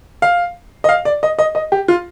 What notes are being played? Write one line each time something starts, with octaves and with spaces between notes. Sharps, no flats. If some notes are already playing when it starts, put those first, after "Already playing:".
F5
D#5
F5
D5
D#5
D#5
D#5
G4
F4